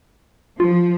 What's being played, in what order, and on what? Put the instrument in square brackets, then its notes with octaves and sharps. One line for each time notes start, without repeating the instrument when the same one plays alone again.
[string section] F3 [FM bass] F4